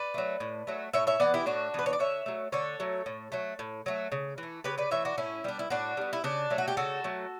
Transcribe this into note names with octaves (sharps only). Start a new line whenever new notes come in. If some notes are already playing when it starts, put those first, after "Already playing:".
Already playing: B4 D5
F#3 A3
A2
F#3 A3
A2 C#5 E5
C#5 E5
E3 B3 D5 F#5
E4 G4
A2 D4 F#4
E3 B3 B4
C#5
D5
D3 C#5 E5
F#3 A3
D3 A4 C#5
F#3 A3
A2
F#3 A3
A2
F#3 A3
C#3
E3
A3
C#3 G4 B4
B4 D5
E3 A3 C#5 E5
D4 F#4
A2 C#4 E4
G3 B3 D4
E4
A2 D4 F#4
G3 B3
E4
C#3 D4
F#3 A3
F#4
G4
C#3 F#4 A4
F#3 A3